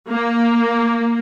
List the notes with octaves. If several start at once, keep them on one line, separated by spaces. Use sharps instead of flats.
A#3